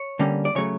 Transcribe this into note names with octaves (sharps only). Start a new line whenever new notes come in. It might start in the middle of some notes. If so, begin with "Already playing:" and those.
Already playing: C#5
D3 G3 A#3 C#4
D5
C#3 F#3 A3 C#5